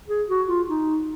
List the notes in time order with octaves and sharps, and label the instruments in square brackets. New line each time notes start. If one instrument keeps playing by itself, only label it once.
[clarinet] G#4
F#4
F4
D#4